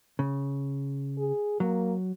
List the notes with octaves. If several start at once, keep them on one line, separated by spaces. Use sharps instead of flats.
C#3
G#4
F#3 A#3